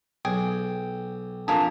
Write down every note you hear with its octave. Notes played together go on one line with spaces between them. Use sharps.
B1 G#4 G5
F2 A#3 D4 G#4 A5 A#5